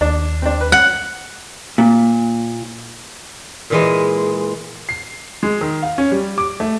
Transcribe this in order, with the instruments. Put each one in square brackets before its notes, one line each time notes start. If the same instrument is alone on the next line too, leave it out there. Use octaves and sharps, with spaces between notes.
[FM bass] D#2 [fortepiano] D4
[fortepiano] C4 D4
B4
[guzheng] F#5
[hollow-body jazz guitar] A#2
[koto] A#2 E3 G#3
[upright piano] C7
G#3
D#3
F5
C#4
G3
D6
A3